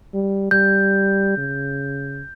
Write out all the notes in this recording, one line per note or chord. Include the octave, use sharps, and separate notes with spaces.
G3
G3 G6
C#3